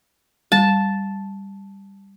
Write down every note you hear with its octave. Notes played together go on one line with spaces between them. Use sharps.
G3 A5